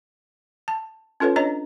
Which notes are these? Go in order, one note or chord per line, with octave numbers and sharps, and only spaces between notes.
A5
C#4 F4 A4 B4 C#5
D4 C#5 D#5 A#5